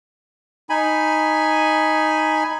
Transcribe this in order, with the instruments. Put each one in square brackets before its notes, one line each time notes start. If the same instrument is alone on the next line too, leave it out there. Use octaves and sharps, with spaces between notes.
[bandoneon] D#4 G#5 B5